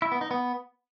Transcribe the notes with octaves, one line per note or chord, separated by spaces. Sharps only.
E4
B3
D#4
B3